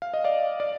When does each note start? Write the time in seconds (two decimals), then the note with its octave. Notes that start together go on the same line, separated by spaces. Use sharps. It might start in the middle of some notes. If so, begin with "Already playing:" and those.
0.02 F5
0.14 D#5
0.24 D5 F5
0.60 D5 F5